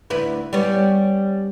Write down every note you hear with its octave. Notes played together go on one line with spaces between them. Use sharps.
D2 E4 B4
G3 B3 C#4